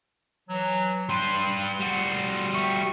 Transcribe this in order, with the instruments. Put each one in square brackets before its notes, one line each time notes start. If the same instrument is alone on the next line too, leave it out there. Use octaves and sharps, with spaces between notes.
[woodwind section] E3 F#3
[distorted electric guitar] G3 B4 [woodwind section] C6
[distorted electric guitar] G3 F#4
[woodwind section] E5 G5 C#6